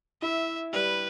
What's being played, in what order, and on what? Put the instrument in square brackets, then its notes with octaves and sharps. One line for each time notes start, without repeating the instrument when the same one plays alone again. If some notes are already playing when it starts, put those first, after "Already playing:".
[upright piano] E4 [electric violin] E5
[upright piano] G3 [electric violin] B4